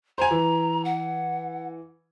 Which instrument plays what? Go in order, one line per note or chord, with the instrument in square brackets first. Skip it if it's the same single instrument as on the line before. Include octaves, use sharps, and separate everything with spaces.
[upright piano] C5 G#5 [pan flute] A#5
[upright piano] E3
[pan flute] F#5